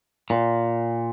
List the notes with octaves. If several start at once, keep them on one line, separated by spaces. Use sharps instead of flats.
A#2